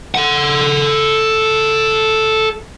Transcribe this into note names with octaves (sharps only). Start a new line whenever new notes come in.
A4 F#5